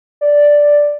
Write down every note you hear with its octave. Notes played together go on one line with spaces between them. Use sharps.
D5